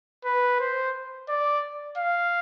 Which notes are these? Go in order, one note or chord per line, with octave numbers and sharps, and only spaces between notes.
B4
C5
D5
F5